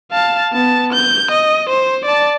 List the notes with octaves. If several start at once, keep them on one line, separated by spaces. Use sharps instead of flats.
F5 A5
B3 A5
G6
D#5
C5
D5 A5